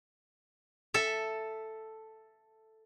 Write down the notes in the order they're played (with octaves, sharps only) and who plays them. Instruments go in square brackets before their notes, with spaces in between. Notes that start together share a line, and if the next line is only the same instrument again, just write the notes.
[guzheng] A4 E5